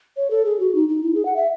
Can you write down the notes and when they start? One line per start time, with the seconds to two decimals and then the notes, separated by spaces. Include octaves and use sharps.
0.17 C#5
0.31 A4
0.45 G#4
0.60 F#4
0.75 D#4
0.89 D#4
1.03 E4
1.15 G#4
1.25 F#5
1.36 E5